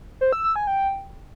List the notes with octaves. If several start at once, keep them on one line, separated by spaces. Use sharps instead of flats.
C5
E6
E6
G#5
G5